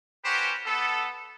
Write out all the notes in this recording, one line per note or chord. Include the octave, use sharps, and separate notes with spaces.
C#4 F#4 G4 B4 C5
B3 A4